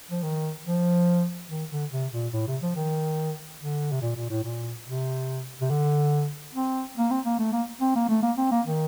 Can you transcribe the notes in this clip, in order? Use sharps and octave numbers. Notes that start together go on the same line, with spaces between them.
F3
D#3
F3
D#3
D3
C3
A#2
A2
C3
F3
D#3
D3
C3
A#2
A#2
A2
A#2
C3
C3
D3
C4
A#3
C4
A#3
A3
A#3
C4
A#3
A3
A#3
C4
A#3
D#3